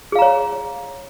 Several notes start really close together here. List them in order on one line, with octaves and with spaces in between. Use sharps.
G#4 F5 A#5 C#5